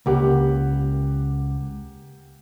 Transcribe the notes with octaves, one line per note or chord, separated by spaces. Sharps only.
C#2 A#3 G4 F#5